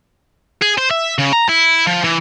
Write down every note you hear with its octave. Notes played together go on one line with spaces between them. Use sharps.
G#4
C5
E5
C#3
A#5
E4
F3
E3